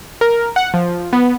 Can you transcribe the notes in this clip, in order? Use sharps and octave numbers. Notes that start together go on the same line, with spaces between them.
A#4
F#5
F3
B3